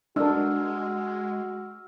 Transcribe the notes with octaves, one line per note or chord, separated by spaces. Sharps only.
G#3 D4 F#4 A#4 E6 F6